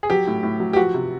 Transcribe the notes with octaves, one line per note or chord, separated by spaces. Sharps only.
G#4
F#3 G4
A2
A2
F#3
G4
F3 F#4
C3